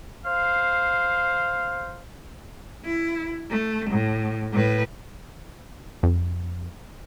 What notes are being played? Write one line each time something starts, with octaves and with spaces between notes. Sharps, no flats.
C5 F5
E4
A3
A2
A2 B4
F2